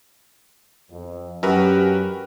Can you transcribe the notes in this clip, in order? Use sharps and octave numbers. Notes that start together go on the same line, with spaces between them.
F2
F#2 C#4 D4 F#4 G4 A#4 B4